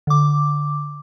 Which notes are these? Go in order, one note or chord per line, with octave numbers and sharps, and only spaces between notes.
D3 D6